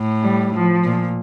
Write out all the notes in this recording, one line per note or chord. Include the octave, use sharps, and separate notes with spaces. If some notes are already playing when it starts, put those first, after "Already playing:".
Already playing: A2
G3
F3
A#2